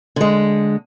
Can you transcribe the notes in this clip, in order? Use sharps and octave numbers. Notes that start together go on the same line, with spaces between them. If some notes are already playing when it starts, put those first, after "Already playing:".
D3 G#3